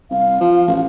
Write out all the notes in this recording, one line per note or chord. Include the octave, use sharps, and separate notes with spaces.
C2 F5
F3
A1